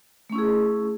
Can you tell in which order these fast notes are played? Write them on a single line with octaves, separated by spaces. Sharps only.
A3 C#4 E4 G#4